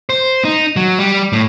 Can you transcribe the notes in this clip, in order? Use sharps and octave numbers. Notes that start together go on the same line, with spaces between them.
C5
D#4
F#3
G3
A2